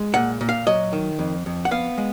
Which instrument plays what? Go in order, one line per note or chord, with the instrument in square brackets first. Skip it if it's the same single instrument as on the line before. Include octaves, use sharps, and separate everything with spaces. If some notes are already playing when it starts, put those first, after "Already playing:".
Already playing: [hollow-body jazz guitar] G#3
A#2 F#5
A#2
F5
F#3 D#5
D#3
F2
F2
F#5
B3 F5
G#3